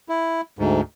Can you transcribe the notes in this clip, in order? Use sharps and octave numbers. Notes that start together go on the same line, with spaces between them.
E4
D2 G#2